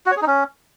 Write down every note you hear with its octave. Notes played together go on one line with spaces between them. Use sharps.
F#4
C#5
G#4
D#4
C#4